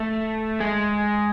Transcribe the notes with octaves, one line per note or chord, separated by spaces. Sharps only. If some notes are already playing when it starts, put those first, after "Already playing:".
Already playing: A3
G#3